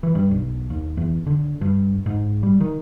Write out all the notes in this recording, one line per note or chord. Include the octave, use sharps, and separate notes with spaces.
E3
G2
B1
D#2
E2
D3
G2
G#2
G3
D#3